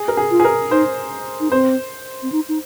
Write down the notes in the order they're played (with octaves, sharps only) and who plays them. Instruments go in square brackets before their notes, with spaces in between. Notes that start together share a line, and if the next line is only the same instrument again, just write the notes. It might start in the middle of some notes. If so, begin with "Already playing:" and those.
Already playing: [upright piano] G#4
A#4
G#4
[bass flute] F4
[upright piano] G#4
A#4
[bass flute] D#4 [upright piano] C5
[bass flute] D#4
[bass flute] C4 [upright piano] C5
[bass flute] C4
D#4
D#4